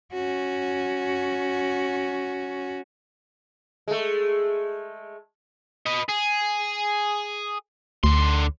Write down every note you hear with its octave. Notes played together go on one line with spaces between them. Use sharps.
C#4 F#4
G#3 A3
B4 D#5
G#4
D2 D3 C6